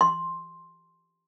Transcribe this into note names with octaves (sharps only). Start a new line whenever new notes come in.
C6